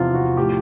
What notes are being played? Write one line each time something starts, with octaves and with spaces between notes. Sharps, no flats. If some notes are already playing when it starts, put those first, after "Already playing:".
Already playing: E2 C3 F3 F4
F#4
A2 F3 G4